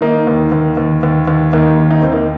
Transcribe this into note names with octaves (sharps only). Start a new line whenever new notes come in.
D#3 A#3 D#4
D#2
D#2
D#2
D#2
D#2
D#2 A#3 D#4
D#3
D#4
D#2 C4
A#3 D#4